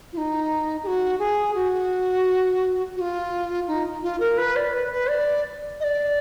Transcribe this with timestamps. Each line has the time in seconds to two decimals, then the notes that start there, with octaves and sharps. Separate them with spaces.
0.13 F4
0.17 D#4
0.83 G#4
0.87 F#4
1.19 G#4
1.55 F#4
2.96 F#4
3.01 F4
3.67 D#4
4.03 F4
4.20 A#4
4.38 B4
4.56 D5
4.73 B4
4.92 B4
5.09 D5
5.80 D#5
5.84 D5